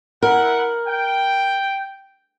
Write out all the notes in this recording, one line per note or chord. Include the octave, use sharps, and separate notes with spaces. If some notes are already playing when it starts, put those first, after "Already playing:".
E4 A#4 F#5
G5